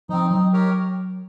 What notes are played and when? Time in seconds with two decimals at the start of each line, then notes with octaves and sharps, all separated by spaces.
0.09 F3 C4 D#4
0.31 F#3 D#4
0.53 G4 A#4 C#5